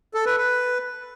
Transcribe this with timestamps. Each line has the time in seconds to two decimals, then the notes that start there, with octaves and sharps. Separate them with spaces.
0.14 A4
0.26 B4
0.37 B4